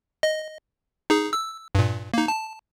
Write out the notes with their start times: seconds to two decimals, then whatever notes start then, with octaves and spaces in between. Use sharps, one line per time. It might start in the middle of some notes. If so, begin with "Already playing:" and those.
0.23 D#5
1.10 D#4 G#4
1.33 E6
1.75 G2 A#2
2.14 A#3 D#4
2.28 A5